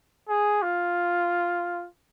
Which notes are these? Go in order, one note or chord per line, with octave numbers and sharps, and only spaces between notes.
G#4
F4